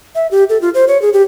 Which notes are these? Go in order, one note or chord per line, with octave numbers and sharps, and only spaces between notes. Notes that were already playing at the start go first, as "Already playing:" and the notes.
E5
G4
A4
F4
C5
C#5
G#4
G4